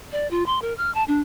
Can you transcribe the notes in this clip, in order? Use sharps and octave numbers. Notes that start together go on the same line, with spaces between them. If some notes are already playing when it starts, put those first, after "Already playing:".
D5
F4
C6
A#4
F6
A5
D4